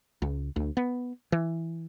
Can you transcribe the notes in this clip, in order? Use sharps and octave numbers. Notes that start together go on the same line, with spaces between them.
C#2
D2
B3
E3